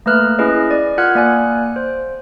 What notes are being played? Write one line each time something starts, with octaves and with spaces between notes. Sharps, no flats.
A3 A#3 B4 F6 F#6
C#4 E4 G#4 B4 D#5
D5
F4 A#4 F#5 F6 F#6 G#6
A#3 D5 G#5 F#6
C5